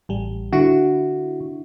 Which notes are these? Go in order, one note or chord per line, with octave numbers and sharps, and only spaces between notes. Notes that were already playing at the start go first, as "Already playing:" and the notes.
A1 G3
D3 E4 F#4